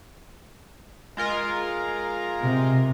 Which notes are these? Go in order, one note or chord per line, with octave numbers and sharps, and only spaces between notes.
G#3 F4 A#4
C3